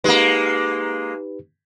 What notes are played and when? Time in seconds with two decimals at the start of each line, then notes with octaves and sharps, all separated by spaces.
0.04 G#3 A#3 D#4 G4 B4